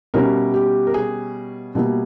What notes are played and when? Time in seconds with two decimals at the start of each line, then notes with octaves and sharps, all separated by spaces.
0.14 B2 G3 C#4 E4 A#4
0.54 G4
0.87 A#4
0.94 G#4
1.75 B2 G3 A#3 E4